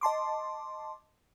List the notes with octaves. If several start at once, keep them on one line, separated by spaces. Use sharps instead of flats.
D#5 A5 C6 D6